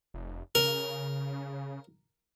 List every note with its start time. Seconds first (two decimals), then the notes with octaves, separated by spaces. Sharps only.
0.14 F1
0.55 C#3 A#4